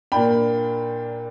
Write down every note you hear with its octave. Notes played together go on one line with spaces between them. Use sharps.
A#2 A#3 D4 G5 B5